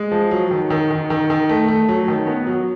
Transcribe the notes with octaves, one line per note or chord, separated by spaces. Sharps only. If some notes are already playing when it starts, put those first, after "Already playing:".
Already playing: G#3
F3
F#3
D#3
D#3
D#3
D#3
D#3
A3
A3
F#3
D#3
B3
F#3